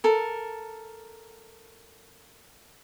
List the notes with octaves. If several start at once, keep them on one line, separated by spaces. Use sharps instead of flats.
A4 A#4